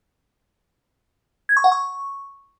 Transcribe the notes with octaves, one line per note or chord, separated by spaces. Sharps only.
G#6
C#6
F#5
C#6